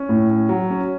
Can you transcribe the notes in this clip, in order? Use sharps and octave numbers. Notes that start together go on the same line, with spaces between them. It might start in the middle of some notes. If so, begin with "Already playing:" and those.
Already playing: C#4
A2
C#4
F#3
C#4